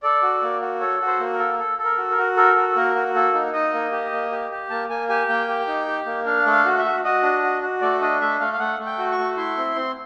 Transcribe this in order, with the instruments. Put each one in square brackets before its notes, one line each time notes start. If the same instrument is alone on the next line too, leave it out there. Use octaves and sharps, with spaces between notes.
[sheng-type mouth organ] A4 D5
F#4
A#3
F#4
A4 C#5
F#4
C5
A#3
A#4
A4
A4
A4
A#4
F#4
A#4
F#4
A4 A#4
F#4
A#3 A#4
F#4
A#3 A4
D#4
D#4 D#5
A#3
G4
A#3
G4
G4
A#3 A5
A#3 G#5
G4 G#5
A#3 G5
G4
D#4
G4
A#3
D4 F5
A3
F5
F#4
E5
F#4
F#4 D#5
D4
F#4
F#4
A3 D5
D4 D#5
A3 E5
A3 F5
F5
A3 F#5
A3
G5
F#4
C#6
A3
E4 C6
C4
C4